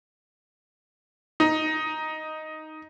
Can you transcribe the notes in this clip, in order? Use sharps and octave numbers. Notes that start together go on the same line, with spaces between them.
D#4